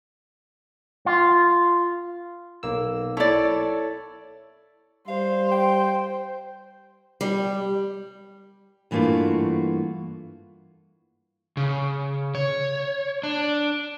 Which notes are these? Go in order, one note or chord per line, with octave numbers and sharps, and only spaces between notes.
F4
B1 A#3 E6
E4 A4 C#5 D5
G3 C5 F5
G5
G3
G2 E3 A3 A#3 F4 F#4
C#3
C#5
D4